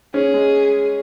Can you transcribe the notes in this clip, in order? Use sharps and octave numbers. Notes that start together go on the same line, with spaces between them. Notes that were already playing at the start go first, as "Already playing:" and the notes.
C#4 G#4
G#3